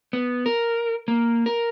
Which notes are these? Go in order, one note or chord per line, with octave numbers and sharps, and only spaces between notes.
B3
A#4
A#3
A#4